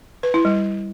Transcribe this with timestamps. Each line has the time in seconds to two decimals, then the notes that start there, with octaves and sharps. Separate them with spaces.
0.23 B4
0.34 E4
0.45 G3